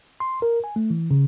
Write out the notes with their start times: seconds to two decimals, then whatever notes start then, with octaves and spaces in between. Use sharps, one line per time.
0.20 C6
0.42 A#4
0.64 G#5
0.76 A3
0.90 E3
1.11 C#3